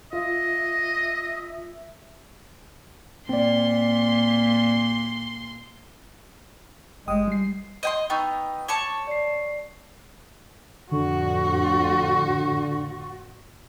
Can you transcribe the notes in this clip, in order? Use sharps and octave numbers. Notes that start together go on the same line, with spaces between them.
F4 D#5 E5
A#2 C4 D5 C6
G1 G#3 G5 D#6
G3 C7
D#5 G5 C6
B3 D#4 G5 C#6 E6
C#5 A5 C#6 D6
D5 C7
F2 A2 D3 F#4 C#6